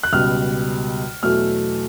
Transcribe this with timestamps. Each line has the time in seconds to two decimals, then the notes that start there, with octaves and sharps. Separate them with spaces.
0.03 F#6
0.13 C#2 B2 G3 F6
1.23 E2 B2 F#3 A3 F6